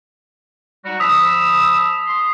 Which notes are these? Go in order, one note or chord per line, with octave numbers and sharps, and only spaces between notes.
G3 D#4 F#4
F3 B5 D#6 E6 B6
C6